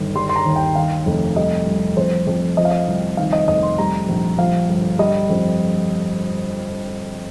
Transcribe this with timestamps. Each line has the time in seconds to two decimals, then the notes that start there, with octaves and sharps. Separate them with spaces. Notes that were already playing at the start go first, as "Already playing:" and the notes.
Already playing: G1 D#3
0.15 G3 C6
0.29 C6
0.36 A#5
0.45 D#2
0.56 G5
0.75 D#3 F5
1.06 F1
1.36 G3 D#5
1.67 C2
1.97 F2 C5
2.27 F2
2.57 F3 D#5
2.65 F5
2.71 D#5
2.87 C2
3.17 D#3 F5
3.33 D#5
3.48 F1 D#5
3.63 C6
3.78 G3 A#5
4.09 A#1
4.38 F3 F5
4.69 G1
4.99 G3 D#5
5.30 F2